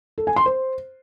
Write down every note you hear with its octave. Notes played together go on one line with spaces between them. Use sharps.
A4
G#5
C6
C5